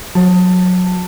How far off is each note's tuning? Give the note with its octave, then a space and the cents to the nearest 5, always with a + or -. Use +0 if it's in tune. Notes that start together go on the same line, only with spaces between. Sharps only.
F#3 -25 A5 +15